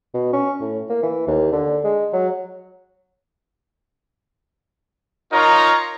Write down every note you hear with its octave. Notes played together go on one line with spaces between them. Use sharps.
B2
C#4
A2
A#3
E3
D#2
D3
G#3
F#3
D#4 F4 A#4 C#5 A#5